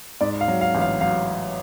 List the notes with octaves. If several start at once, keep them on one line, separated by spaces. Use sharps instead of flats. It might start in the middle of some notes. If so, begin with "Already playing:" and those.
G#2 D5
F5
F#3
F5
A1
F5
F#3 F5